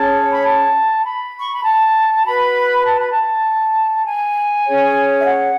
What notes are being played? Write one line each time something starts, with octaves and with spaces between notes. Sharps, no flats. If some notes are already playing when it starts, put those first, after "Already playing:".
Already playing: C#4 G#4 C#5 A5
B5
A5
B5
C#6
B5
A5
F#4 B4 B5
A5
B5
A5
G#5
C#4 G#4 C#5
E5
F#5